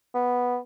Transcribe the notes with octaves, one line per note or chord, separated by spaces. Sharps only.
B3